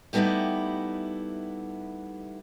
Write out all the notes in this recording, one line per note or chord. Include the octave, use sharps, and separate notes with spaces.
G3 A3 B3 D#4 E4 G4